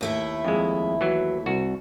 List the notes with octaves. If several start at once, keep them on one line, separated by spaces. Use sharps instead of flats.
D#2 A3 E4
F2 G#3
E3 F#3
C2 F#4